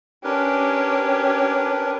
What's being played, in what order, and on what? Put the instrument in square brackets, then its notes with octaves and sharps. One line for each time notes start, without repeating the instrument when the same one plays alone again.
[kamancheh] C#4 G4 [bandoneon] D4 A#4 B4